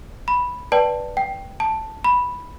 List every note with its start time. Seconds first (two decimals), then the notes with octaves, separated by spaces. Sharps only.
0.28 B5
0.72 B4 D5 G5 A5
1.17 G5
1.60 A5
2.04 B5